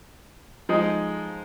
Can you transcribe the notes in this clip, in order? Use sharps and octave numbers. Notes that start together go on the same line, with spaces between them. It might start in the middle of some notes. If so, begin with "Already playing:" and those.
F3 G#3 D#4